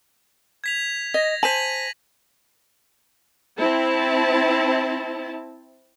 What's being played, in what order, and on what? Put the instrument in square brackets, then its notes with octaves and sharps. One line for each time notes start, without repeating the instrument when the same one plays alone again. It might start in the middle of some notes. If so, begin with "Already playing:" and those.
[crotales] G#6 B6 F7
[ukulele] D#5 [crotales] A#6
[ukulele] C5 G#5 A5 [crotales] B6 D#7 F#7
[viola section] C4 E4 A5